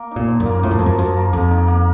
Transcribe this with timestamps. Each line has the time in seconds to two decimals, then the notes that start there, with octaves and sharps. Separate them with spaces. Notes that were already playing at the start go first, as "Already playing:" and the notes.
Already playing: A#3
0.11 D#4
0.16 A#2
0.28 F3
0.40 F#2
0.45 A#3
0.63 A2 F3
0.71 F#2
0.79 F2 F3
0.86 F#2
0.98 F#2 F3
1.16 A#3
1.33 F2 A#3
1.51 D#4
1.68 A#3